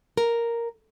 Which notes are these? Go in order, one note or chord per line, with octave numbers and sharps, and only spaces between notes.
A#4